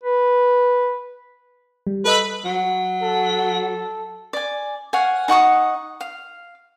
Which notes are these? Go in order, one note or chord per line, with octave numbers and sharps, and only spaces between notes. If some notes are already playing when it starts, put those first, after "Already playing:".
B4
G3
A4 B4 D#5 E6
F#3
A4
D5 G#5
C#5 F5 F#5 G#5
D#4 F#5 C#6 D#6
F5